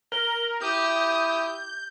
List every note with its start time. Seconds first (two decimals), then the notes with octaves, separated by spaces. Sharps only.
0.12 A#4 G7
0.61 E4 G4 D#6 G6